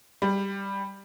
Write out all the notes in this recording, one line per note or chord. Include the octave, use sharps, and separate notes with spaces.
G3